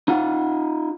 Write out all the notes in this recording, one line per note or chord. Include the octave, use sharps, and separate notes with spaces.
D#4 F4 F#5